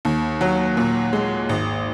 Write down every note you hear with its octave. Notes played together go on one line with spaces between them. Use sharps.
D#2
F#3
A#2
G#3
G#1